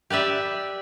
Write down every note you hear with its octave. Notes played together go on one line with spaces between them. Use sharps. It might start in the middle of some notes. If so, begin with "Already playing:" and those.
G4 B4 D5 E5